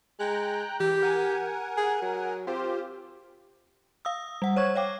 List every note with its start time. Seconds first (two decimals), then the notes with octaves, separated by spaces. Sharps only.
0.19 G#3 G5 A#5 F#6
0.80 E3 G4
1.02 A#4 F#5 G#5
1.77 G#4
2.02 F#3
2.47 C4 F4 G4 C5
4.05 F5 D#6 E6
4.42 G3 F#5
4.56 C5 C#5 C#6 G#6
4.75 C#5 F5 G5 D6